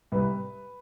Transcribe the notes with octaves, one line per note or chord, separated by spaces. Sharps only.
C2 B4